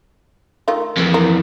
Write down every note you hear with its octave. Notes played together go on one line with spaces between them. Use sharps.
D#3 A3 F4
F2 E3
A#4